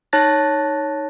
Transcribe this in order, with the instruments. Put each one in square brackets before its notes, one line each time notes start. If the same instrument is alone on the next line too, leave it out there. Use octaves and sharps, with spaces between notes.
[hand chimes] D#4 C#5 A5 F#6 A6 A#6